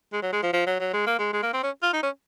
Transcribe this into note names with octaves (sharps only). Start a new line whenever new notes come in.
G#3
F#3
G#3
F3
F3
F#3
F#3
G#3
A#3
G#3
G#3
A#3
C4
C#4
F4
D#4
C#4